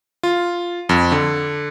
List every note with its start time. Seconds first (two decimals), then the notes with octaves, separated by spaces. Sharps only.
0.23 F4
0.89 F2
1.12 D3